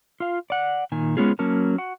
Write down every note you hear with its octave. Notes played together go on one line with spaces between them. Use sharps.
F4 F5
D5 F#5
A#2 D#3 G#5
G#3 B3 C#4 F4 G#4
F#3 A#3 C#4 A#4 A5
F#4 F#5